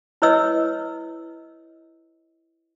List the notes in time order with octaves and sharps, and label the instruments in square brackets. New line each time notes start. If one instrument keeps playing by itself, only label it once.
[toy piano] E4 B4 C#5 D#5 E6